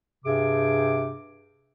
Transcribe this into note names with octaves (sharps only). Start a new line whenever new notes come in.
G2 C3 G#4 D6